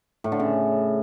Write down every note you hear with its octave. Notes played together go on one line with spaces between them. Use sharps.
A2
D3
C#3